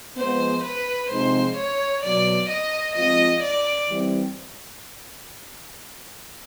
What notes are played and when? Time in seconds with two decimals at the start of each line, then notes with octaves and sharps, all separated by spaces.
0.17 F3 G#3 B3 C5
0.64 B4
1.10 C3 F3 G#3 C4 D#4 C5
1.57 C#5
2.03 B2 F#3 B3 D5
2.49 D#5
2.95 F3 G#3 C4 F4 D#5
3.43 D5
3.89 E3 G3 C4